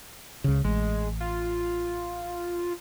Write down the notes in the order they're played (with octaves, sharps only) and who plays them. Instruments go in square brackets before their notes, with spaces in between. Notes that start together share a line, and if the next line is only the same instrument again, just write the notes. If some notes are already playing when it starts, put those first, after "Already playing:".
[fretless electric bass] C#2 C#3
[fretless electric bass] A1 [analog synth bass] G#3
[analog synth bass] F4